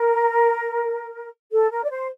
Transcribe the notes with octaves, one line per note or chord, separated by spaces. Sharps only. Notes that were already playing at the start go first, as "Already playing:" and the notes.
Already playing: A#4
A4
A#4
D5
C5